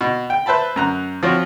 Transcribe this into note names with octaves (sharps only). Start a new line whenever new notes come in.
B2
G5
B4 C5 E5 A5 B5
F#2 A#5 F#6
F3 C4 F4 F#4 C#5